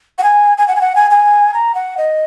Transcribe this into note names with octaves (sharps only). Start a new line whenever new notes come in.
F#5
G#5
G#5
F#5
G#5
F#5
G#5
G#5
A#5
F#5
D#5